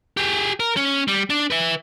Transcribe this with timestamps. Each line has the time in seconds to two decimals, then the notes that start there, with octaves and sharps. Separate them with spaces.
0.17 G4 G#4
0.60 A#4
0.77 C#4
1.08 G3
1.30 D4
1.50 B4 E5